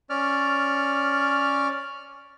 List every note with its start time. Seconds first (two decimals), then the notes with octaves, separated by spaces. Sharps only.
0.10 C#4 D5 F6